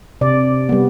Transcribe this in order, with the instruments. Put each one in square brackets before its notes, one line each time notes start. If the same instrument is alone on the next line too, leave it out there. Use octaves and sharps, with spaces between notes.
[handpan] C3 D5
G3 B3